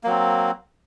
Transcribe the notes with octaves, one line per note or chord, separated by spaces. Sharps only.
F#3 A#3 C4